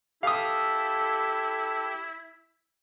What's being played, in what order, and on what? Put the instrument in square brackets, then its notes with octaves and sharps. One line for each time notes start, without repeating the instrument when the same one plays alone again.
[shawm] E4 [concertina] G4 [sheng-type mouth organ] A4 [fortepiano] F5 D#6